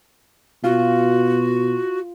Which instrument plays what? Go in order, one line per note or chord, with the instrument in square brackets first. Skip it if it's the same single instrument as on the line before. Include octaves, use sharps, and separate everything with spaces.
[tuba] B2 [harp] F4 [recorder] F#4